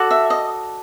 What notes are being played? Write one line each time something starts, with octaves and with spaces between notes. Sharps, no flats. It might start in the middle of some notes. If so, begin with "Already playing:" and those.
Already playing: F#4 A4 D5
E5
D#5